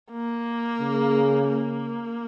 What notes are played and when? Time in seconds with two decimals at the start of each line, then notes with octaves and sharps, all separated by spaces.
0.11 A#3
0.81 C#3
1.49 A#3